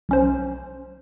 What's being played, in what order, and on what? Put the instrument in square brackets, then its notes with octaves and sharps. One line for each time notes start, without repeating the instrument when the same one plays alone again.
[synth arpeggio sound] B1 C#4 C5